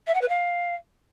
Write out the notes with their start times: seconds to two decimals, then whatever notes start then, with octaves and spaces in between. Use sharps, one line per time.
0.07 E5
0.14 F#5
0.21 B4
0.29 F5